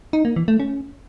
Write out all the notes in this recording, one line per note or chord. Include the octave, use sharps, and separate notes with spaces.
D#4
A#3
E3
A3
C#4